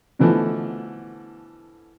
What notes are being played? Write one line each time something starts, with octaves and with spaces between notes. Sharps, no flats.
B2 D3 E3 F3 A3